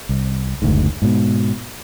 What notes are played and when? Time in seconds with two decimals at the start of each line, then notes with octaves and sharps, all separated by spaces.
0.09 C2
0.62 F#1 D2 G#2
1.02 G#2 B2